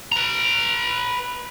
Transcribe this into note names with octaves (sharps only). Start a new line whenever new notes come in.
B4 A#5